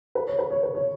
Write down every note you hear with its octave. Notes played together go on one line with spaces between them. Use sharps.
B4
C#5
B4
C#5
B4
C#5